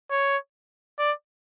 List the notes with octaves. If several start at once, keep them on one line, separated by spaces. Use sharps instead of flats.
C#5
D5